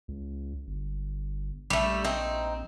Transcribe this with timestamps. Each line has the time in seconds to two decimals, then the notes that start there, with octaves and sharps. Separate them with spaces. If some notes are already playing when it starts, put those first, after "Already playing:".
0.08 C#2
0.67 G1
1.70 A#1 G3 A3
2.04 C4 D#4